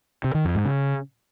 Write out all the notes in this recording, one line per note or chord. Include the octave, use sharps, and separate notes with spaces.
C3
D#3
F2
G#2
C#3